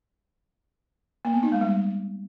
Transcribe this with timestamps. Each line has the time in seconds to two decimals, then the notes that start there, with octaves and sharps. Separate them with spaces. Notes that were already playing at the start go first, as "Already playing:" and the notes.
1.25 A#3
1.34 B3
1.43 D#4
1.52 G#3
1.61 G3